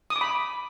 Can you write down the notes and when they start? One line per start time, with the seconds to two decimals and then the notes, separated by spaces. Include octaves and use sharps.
0.10 D#6
0.16 D6
0.21 B5